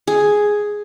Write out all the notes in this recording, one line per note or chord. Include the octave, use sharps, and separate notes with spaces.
G#4